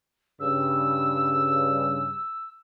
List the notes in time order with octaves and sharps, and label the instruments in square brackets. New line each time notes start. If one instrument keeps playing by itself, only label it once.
[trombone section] G2 C#3 [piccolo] E6